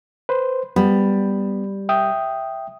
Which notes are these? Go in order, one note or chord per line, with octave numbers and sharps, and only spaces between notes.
B4 C5
G3 B3 B5
E5 G5 D#6